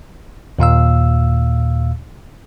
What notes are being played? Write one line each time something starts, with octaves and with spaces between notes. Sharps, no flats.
D#2 A#2 F5 E6